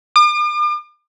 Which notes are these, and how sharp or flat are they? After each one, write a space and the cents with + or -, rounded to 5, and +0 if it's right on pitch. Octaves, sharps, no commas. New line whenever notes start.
D6 +45